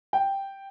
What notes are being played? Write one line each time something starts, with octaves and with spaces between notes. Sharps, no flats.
G5